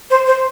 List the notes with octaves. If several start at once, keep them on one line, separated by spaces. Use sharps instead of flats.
C5
C5